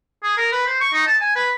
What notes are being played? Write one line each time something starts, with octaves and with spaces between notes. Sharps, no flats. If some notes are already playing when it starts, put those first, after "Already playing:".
G#4
A#4
B4
C5
C#6
D#4
A5
G#5
B4